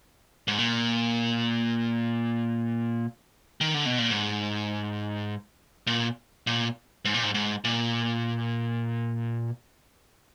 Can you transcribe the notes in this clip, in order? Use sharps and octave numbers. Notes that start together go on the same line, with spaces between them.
G#2
A#2
D#3
D3
B2
A#2
G#2
A#2
A#2
G#2
A#2
G#2
G#2
A#2